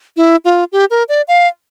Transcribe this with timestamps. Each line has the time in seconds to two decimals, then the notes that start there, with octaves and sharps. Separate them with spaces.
0.17 E4
0.45 F4
0.72 G4
0.90 A#4
1.09 D5
1.28 F5